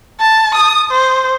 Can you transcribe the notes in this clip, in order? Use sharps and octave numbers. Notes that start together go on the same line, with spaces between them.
A5
D#6
C5